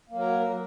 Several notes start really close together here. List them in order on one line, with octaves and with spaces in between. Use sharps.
A#3 F#3 A#4